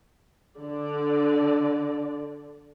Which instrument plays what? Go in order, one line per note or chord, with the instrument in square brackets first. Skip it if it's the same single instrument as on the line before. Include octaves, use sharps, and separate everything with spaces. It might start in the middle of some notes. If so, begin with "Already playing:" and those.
[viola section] D3 D5